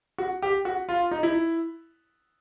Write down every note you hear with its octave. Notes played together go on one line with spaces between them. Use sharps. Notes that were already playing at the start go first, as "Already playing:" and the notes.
F#4
G4
F#4
F4
D#4
E4